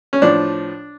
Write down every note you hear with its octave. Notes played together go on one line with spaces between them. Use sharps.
C#4
A2 F3 D4